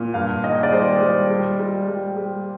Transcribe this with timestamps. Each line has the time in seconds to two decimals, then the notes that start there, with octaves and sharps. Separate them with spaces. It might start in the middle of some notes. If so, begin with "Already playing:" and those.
Already playing: A#2
0.14 G2 F5
0.43 D#3 D#5
0.63 D5
0.72 G3 C5
1.01 G3
1.31 G3
1.60 G3
1.88 G3
2.17 G3